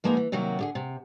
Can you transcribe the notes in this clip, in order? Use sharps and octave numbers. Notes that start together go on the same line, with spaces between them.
F3 G#3 A#3 B3 D#4 F4
E3
C3 D#3 F#3 A#3 F#4
D3 G4 G#4
C3